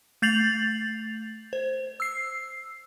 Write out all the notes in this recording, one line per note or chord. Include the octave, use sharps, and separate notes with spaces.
A3 G6 A6 C7 F7 F#7
C5
E6 C7